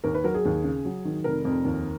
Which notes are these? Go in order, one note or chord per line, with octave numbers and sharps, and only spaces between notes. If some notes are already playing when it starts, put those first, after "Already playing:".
D#2 A#4
B4
F#3 A#4
G#4
D#2
C#3
F#3
D#3
F1 A#4
F2
D#2